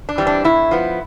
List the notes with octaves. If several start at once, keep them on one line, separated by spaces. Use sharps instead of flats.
D4
E3 G3 C4
D4
A2 E4
F3 B3